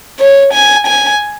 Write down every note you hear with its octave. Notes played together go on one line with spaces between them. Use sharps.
C#5
G#5
G#5